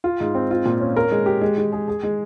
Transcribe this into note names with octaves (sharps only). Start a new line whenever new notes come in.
F4
G#2
C4
F4
A#2
C#4
A#4
G#3
G4
G#3
G#3
G#4
G#4
G#3